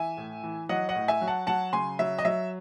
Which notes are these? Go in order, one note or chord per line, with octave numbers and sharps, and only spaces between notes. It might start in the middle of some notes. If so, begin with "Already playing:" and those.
Already playing: E3 E5 G#5
A2
E3
F#3 D#5 F#5
D#5 F#5
A2
E5 G#5
F#3
F#5 A5
F#3 F#5 A5
C#3 G#5 C6
F#3 E5
D#5
F#3 E5